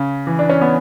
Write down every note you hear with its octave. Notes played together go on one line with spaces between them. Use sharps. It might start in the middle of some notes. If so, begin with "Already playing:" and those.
Already playing: C#3
E3
D4
C#4
B3